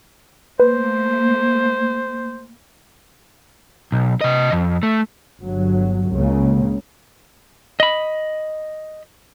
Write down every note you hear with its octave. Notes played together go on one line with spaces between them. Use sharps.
A3 A#3 B4 C5
B1
C3 D#5
F2
A3
G1 F#3
C#2 C#3 A#3
D#5 B5